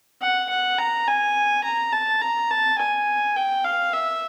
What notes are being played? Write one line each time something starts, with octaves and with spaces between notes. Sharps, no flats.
F#5
F#5
A#5
G#5
A#5
A5
A#5
A5
G#5
G5
F5
E5